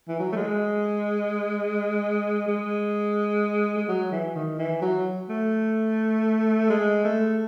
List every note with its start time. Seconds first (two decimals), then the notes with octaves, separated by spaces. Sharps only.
0.08 E3
0.19 F#3
0.32 A3
0.36 G#3
2.48 G#3
3.77 G#3
3.88 F#3
4.11 E3
4.35 D#3
4.59 E3
4.82 F#3
5.29 A3
6.70 G#3
7.05 A3